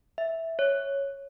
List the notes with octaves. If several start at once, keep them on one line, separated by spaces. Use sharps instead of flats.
E5
C#5